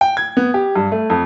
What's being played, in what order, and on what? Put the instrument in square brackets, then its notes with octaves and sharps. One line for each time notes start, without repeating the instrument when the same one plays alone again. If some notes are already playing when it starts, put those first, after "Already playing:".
[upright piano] G5
G#6
B3
G4
G2
A3
F2